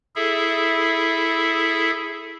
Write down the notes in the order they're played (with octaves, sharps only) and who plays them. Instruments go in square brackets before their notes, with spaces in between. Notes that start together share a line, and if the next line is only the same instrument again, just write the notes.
[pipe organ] E4 G#4 A4 E5